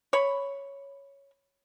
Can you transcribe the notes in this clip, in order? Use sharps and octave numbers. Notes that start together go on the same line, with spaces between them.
C#5 B5